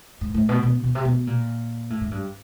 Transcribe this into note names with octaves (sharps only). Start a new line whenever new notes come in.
G#2
A2
B2
B2
B2
C3
B2
A#2
A2
G#2
G2